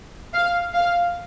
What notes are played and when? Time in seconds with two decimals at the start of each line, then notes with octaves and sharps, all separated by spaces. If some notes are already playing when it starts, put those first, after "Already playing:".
0.33 F5
0.73 F5